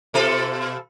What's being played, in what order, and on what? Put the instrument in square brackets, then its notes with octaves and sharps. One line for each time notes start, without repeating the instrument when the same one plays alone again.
[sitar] B2 F4 A4